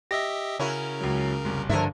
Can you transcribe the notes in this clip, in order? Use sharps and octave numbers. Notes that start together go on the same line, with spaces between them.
G4 D#5 E5 A#6
C#3 C#4 E4 F#4 A#4
C#2 F#3
F#1 C2
G2 D3 F3 A#4 E5